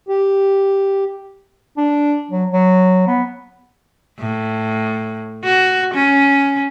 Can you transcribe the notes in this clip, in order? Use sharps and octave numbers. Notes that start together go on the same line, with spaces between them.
G4
D4
F#3
F#3
B3
A2
F#4
C#4